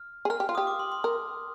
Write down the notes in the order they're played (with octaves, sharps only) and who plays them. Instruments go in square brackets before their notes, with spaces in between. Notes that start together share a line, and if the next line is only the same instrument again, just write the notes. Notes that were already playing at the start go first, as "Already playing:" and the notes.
Already playing: [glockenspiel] F6
[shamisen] G#4
[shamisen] A#4 [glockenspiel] F6
[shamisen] G4
F4
[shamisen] G4 [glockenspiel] D#6
[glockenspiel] D6
C6
C6
[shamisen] A#4